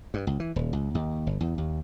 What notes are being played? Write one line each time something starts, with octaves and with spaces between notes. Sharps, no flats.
G2
C#2
E3
D#1
C#2
D#2
G1
E2
D#2